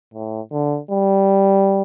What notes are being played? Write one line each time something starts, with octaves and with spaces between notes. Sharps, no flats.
A2
D3
G3